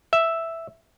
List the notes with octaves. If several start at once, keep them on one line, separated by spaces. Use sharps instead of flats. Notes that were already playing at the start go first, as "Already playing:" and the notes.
E5